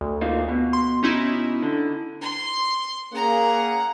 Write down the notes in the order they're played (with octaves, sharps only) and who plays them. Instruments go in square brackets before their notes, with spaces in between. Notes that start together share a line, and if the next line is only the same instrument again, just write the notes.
[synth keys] D2
[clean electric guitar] A#3 D#4 F4
B2
[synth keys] C6
C#4 D#4 E4
[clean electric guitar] D3
[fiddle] C6
[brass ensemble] A#3 C#4 G#4 [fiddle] F#5 A#5